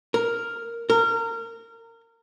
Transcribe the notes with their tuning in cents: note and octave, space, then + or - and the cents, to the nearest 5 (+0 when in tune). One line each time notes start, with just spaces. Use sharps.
A#4 +0
A#4 -25